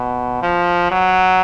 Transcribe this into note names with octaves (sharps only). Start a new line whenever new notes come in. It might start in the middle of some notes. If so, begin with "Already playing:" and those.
Already playing: B2
F3
F#3